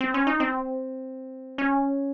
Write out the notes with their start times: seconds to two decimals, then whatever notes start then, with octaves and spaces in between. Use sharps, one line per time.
0.01 C4
0.14 C#4
0.27 D#4
0.40 C4
1.58 C#4